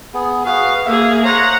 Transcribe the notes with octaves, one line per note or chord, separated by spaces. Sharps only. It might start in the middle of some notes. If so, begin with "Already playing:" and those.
B3 G#4
F#4 G#4 B4 F5
A#3 G#4 E5 F5
C5 C#5 F#5 A#5